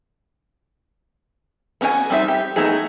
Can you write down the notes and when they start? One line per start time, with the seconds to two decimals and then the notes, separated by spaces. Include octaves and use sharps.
1.81 B3 C#4 F#4 A#4 G#5
2.10 G3 C4 D#4 A4 E5
2.28 G4
2.56 A3 B3 D#4 E4 G#4